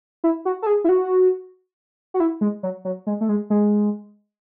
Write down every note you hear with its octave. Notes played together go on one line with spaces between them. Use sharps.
E4
F#4
A4
G#4
E4
F#4
F#4
E4
G#3
F#3
F#3
G#3
A3
G#3
G#3